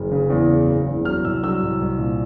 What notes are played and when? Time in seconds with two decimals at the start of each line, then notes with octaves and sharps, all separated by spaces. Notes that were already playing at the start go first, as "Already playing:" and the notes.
Already playing: F#1
0.11 C#3
0.30 E2
0.49 C#3
0.67 F#1
0.86 E2
1.05 F#3 F6
1.24 C2 E6
1.44 F#3 E6
1.62 C2
1.81 C2
1.99 A#2